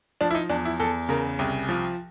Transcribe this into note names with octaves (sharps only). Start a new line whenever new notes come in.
F3 D4
E4
D#4
E2 D4
E4
E2 A4
C#3 A#4
C2
F3